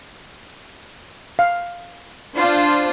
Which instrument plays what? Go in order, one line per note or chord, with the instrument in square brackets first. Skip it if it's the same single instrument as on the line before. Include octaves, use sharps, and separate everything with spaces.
[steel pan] F5
[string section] D4 F4 C5